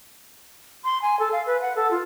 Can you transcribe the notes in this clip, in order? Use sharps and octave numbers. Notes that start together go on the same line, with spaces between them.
C6
G#5
A4
F5
B4
F#5
A4
F4